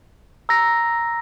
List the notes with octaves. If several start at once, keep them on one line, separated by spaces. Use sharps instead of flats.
A#5 E6 A#6